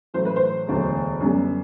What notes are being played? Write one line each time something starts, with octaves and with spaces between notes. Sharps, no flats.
A1 A2 F#3 A3 C5
B4
C5
E1 D2 D3 F#3
F#2 D3 G3 B3